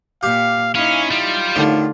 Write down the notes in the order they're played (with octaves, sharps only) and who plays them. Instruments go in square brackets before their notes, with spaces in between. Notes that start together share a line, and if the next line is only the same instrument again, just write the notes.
[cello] A#2 [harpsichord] G4 [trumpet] F5
[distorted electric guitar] C#4 [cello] D#4 E4 [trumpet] F5
[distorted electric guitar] G3 [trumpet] F4
[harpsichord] D#2 A2 [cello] D3